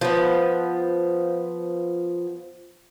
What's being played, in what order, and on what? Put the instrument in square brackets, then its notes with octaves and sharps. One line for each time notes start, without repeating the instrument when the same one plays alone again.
[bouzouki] F3 B3